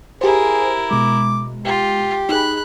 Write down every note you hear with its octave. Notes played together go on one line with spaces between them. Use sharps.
E4 G4 G#4 A#4 C5
B2 G#3 D6
F4 G4
D#4 G#4 B5 F#6